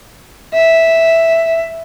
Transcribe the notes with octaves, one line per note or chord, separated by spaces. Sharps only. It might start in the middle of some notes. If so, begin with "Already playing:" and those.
E5